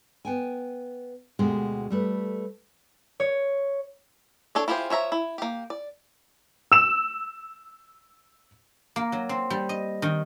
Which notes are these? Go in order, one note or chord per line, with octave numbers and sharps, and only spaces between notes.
B3 G5 G#5
D2 B2 G#3 G4
G3 A3 B4
C#5
D4 A4 C#5 D5
E4 F4 G4 G#4 C5
F3 C#5 E5 A#5
E4
A#3 G4
D5
E6 E7
A#3
F#3
C4
G3
D#5
D#3